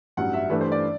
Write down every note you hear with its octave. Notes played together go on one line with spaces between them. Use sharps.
A1 G2 F#3 F#5
E5
G2 E3 A3 D4 B4
C5
D5